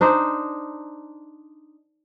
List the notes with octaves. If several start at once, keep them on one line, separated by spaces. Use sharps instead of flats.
D4 D#4 C5